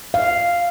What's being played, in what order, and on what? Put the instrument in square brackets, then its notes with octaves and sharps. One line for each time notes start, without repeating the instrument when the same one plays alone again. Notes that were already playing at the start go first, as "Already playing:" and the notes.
[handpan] F5